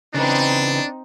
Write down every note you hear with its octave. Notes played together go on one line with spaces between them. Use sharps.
C#3 E3 C4 D4 D#4 B4